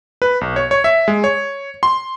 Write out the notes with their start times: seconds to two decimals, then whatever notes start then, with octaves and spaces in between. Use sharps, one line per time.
0.22 B4
0.41 B1
0.56 C#5
0.71 C#5
0.84 E5
1.08 G#3
1.24 C#5
1.83 C6